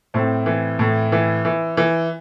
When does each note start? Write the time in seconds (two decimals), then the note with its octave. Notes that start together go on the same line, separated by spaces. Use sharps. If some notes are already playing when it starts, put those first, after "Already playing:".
0.14 A2 C4
0.46 E3
0.79 A2
1.12 E3
1.45 E3
1.77 E3